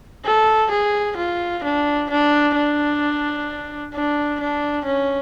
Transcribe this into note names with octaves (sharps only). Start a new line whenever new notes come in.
A4
G#4
F4
D4
D4
D4
D4
D4
C#4